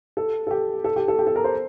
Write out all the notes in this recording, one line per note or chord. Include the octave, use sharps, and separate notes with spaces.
A4
A4
G4
A4
G4
A4
G4
A4
A#4
C5